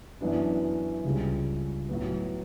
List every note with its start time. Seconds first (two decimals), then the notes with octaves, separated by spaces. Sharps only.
0.21 F#2 E3 B3 D4
1.04 C#2 C#3 G3
1.89 A2 F#3 B3